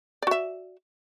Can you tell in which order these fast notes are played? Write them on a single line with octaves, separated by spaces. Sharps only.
D5 F#4 E5